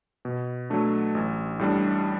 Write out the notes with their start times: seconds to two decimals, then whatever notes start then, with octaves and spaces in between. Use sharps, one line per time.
0.25 B2
0.70 F#3 A3 D4
1.15 A1
1.59 A2 G3 D4